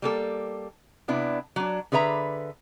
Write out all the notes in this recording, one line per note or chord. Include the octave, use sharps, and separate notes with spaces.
G3 A#3 A4
C3 B3 D4 E4
F#3 D4
D3 G#4 B4 E5 A#5